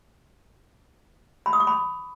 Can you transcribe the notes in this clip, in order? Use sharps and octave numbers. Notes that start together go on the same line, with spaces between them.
B5
D#6
D6
B5